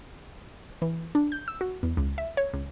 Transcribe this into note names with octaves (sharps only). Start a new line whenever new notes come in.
E3
D4
G6
E6
F#4
E2
C#2
E5
C#5
C#2